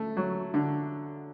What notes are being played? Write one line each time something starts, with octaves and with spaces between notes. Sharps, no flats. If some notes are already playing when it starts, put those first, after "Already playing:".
Already playing: A3
F#3
D3